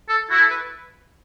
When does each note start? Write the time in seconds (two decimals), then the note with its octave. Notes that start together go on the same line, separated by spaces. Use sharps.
0.09 A4
0.30 E4 F#4
0.40 A4
0.50 B4